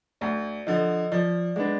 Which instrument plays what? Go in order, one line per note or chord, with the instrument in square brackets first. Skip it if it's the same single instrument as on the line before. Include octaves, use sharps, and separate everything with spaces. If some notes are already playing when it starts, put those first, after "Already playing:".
[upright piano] D2 [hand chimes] D5
[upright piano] D3 F3 [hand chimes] D#5
[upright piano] F3 [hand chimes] D5
[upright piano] G#3 B3 D4 [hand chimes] D5